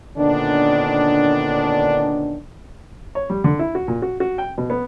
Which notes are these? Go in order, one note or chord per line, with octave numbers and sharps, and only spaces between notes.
A#2 D3 D#3 B3 C#4 D4
C#5
G3
D3
E4
F#4
A#2
F#4
F#4
G5
B2
B3